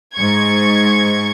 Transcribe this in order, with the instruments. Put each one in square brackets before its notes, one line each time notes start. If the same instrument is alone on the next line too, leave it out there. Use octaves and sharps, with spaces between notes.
[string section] G#2 C#6 G#6